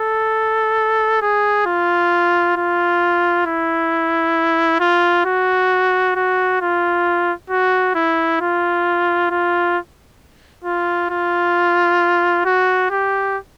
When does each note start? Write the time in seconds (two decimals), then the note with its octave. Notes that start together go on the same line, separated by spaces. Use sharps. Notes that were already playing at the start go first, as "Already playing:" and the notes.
Already playing: A4
1.22 G#4
1.66 F4
2.56 F4
3.46 E4
4.80 F4
5.25 F#4
6.16 F#4
6.61 F4
7.50 F#4
7.95 E4
8.41 F4
9.31 F4
10.64 F4
11.10 F4
12.45 F#4
12.90 G4